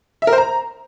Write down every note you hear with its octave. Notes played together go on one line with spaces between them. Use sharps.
E5
A#4
C5
A#5